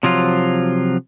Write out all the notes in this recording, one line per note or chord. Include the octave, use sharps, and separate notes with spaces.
C3 F3 F#3 F4